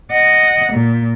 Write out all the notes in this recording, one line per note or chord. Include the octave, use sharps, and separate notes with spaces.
D#5 F#5
A#2